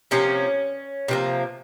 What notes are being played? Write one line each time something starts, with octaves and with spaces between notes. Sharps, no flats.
C3 F3 A#3 C#4
C3 F3 A#3